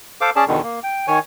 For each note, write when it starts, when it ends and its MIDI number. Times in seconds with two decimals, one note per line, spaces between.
0.21 0.30 69
0.21 0.30 72
0.21 0.30 77
0.21 0.30 86
0.36 0.45 61
0.36 0.45 68
0.36 0.45 74
0.36 0.45 81
0.48 0.61 40
0.48 0.61 47
0.48 0.61 50
0.48 0.61 51
0.63 0.79 58
0.83 1.06 79
1.08 1.19 51
1.08 1.19 73
1.08 1.19 80